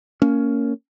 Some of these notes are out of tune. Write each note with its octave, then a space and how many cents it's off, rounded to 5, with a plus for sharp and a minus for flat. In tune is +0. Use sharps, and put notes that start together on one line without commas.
A#3 -15 C#4 +10